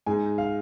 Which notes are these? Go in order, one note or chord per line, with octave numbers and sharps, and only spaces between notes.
G#2 G#3 G#5
F5